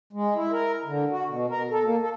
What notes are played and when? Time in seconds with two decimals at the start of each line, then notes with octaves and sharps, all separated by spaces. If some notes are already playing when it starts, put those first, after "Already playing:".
0.13 G#3
0.35 E4
0.52 A#4
0.85 D3
1.10 F#4
1.28 B2
1.50 A#4
1.71 A4
1.84 A#3
2.02 A4